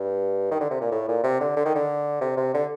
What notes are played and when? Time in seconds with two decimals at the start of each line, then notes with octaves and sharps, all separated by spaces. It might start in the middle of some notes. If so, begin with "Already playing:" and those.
Already playing: G2
0.51 D#3
0.61 D3
0.70 C3
0.81 A#2
0.91 A2
1.08 A#2
1.24 C3
1.40 D3
1.56 D3
1.65 D#3
1.75 D3
2.21 C3
2.37 C3
2.54 D3